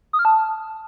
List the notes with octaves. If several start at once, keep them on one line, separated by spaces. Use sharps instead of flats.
D#6
F6
A5